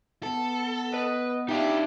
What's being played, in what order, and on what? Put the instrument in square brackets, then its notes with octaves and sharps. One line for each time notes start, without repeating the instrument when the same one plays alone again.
[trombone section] B3 [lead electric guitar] A4
[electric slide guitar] B4 [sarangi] D#5
[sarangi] D4 [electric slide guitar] D#4 E5 F5 [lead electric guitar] G4